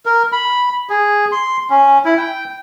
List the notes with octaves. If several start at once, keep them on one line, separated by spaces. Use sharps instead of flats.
A#4
B5
G#4
C6
C#4
E4
G5